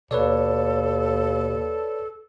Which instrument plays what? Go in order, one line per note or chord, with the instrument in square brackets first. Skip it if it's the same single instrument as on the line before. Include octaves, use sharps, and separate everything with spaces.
[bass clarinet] D#2 [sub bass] B2 [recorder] A4 [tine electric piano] B4 C#5 D5